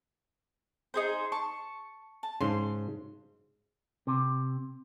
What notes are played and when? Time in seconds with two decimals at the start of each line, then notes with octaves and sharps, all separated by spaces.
0.94 D#4 G#4 C5
1.32 A5 C#6
2.23 A5
2.41 G#2 C#3 C6
4.07 C3